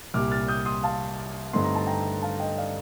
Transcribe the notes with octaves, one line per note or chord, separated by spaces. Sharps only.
C2 A#2 G3 D6 F6
F6 A6
D#6 G6
C6 D#6
F5 A5
G2 D3 A3 C4 D#4 C6
A#5
A5
G5 A#5
F5 A5
D#5 G5
D5 F5